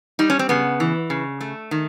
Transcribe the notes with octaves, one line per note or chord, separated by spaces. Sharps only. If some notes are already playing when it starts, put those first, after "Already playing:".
G3 D#4
C#4
C4
C#3 B3
E3
C#3
A3
D#3